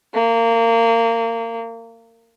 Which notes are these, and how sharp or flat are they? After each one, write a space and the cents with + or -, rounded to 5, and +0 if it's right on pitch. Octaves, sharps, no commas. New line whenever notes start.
A#3 -25